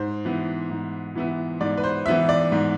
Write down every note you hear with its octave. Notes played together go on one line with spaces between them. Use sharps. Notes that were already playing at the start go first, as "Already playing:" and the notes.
Already playing: G#2 C5
E3 B3 E4
G#2
E3 B3 E4
G#2 D5
B4
C5
E3 B3 E4 E5
D5
G#2